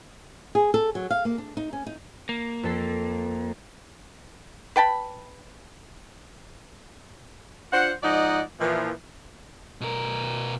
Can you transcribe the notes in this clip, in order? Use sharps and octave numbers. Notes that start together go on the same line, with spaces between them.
G#4
A4
F#3
F5
A#3
D4
D#4
C#4
D#4
A#3
F2 A4 C7
B4 G5 A5 B5
D4 F4 C5 F#5
G#2 F3 D#4 D5 D#5 F#5
A#2 E3 F3
B2 A#4